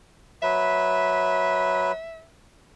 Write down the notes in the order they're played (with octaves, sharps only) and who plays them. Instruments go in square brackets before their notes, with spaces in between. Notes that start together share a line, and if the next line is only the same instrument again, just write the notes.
[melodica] F#3 B4 [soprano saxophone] E5